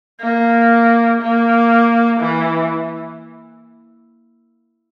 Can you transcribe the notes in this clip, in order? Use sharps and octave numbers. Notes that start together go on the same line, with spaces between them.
A#3
A#3
E3